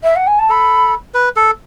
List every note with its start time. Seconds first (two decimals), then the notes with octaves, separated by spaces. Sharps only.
0.03 E5
0.15 F#5
0.26 G#5
0.39 A5
0.49 A4 B5
1.14 B4
1.36 A4